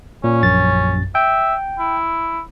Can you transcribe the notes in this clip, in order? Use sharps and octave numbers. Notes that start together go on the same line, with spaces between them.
A#2 C#4
A#1 F#2 A6
E5 G5
E4